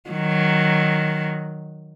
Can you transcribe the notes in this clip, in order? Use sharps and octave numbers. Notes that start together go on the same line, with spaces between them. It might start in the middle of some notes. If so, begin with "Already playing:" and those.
D#3 F#3